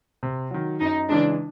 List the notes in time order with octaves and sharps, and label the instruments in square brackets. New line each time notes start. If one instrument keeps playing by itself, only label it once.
[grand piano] C3
D#3 F#3
[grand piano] F#2 [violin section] D#4
[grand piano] C#3 E3 G#3 [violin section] D4